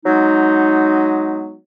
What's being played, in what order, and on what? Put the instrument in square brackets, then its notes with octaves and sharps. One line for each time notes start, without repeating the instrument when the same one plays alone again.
[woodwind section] F#3 G#3 B3 D#4